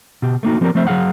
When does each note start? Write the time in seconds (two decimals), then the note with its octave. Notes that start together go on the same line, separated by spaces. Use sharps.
0.22 B2 G4
0.43 A3 A#3 D#4 F#4
0.61 F3 C4 G4 G#4 A#4 D5
0.75 F3 A3 C4 C5 E5
0.87 F#3 G#4 F5 F#5